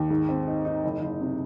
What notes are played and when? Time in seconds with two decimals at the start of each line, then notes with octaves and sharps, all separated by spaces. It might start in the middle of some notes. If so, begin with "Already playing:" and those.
Already playing: D#2
0.10 G#2
0.29 C4
0.47 D#4
0.65 D#4
0.84 F#1
1.02 F#1
1.21 C3